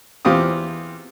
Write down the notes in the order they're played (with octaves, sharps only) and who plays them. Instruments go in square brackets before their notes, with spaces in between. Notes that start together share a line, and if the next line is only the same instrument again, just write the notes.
[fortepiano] E2 C4 F4 G4 D#6